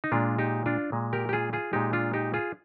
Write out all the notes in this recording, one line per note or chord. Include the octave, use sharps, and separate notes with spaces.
D#4
A#2 G#3 D4 F4
D#4 G4
D4 F4
A#2 G#3
G4 A#4
G4
F4 G#4
F4 G#4
A#2 G#3 D#4 G4
D4 F4
D#4 G4
F4 G#4